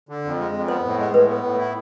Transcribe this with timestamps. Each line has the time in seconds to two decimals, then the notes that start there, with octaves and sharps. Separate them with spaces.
0.09 D3
0.24 F2
0.39 G#3
0.54 F2
0.68 B3 C5
0.85 A2
0.99 G#3
1.14 A2 B4
1.29 B3
1.44 A2
1.59 E4